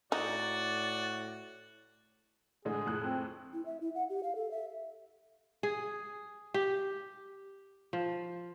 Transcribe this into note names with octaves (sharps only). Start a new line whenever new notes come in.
A2 D#4 F#4 D5
A2 D3 G#3 G#4
F2 A2 F#6
C4
E4
E5
E4
F#5
G4
F5
A4
E5
G#4
G4
F3